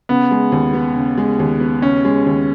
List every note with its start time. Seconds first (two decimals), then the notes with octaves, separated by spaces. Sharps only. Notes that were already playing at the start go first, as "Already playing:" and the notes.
0.09 C#3 B3
0.31 G#3
0.52 D#2
0.73 B3
0.96 C#3
1.18 G#3
1.39 D#2
1.60 B3
1.82 C#3 C#4
2.05 G#3
2.26 D#2